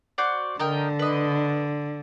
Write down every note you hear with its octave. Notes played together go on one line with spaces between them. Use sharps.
F#4 C5 D5
D3 A#4 D#5 G5
B4 D#5